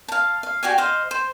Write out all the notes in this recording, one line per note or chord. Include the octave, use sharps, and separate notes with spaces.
F5 A5
F5
F#4 G4 D5 G#5
C5 D#5 F5
C5